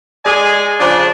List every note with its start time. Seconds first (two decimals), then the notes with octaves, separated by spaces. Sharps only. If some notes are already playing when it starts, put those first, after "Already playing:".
0.25 G#3 G#4 D5 D#5 G#5
0.80 C#3 F3 D4